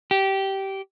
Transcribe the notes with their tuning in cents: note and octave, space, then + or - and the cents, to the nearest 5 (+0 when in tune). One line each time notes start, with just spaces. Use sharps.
G4 -15